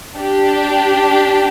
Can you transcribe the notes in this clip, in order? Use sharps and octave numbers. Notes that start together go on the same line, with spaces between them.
D4 G4